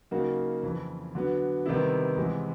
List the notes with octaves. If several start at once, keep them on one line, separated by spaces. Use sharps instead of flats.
C#3 F#3 A#3 D#4 F#4
F2 C#3 E3
D3 F#3 B3
C3 D#3 G3 B3 E4
E2 C3 E3 G#3